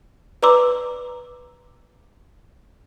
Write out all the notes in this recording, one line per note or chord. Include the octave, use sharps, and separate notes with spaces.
B4 D5 A#5 C6 D6 E6